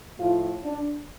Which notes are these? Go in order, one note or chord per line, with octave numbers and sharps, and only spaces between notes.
A2 F3 F4
D4